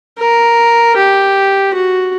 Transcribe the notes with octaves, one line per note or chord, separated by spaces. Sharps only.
A#4
G4
F#4